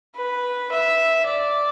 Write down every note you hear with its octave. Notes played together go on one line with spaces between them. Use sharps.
B4
E5
D5